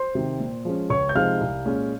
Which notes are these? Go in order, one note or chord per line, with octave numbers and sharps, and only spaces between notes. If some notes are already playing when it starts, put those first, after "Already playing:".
Already playing: C5 C6
C3 D#3
A#2
F3 G#3 C#4
C#2 C#5 C#6
G6
C3 F3 G#3 D#4 F5 F6
C2
A#2 G#3 C#4